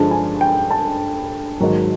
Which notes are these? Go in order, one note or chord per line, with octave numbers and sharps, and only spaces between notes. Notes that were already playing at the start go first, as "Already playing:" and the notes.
Already playing: G2 D3 F3 G#3 A5
G#5
G5
A5
G#2 D#3 F#3